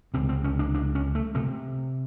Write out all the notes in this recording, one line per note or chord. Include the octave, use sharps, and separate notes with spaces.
C#2 C3 C4
C4
C#4
D4
D4
C#4
A3
C3 A3